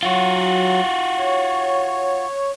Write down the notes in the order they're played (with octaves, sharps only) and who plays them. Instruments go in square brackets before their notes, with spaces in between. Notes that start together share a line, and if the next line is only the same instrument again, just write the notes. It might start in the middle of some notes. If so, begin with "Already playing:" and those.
[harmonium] F#3 [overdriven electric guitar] F4 F#4
[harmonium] C#5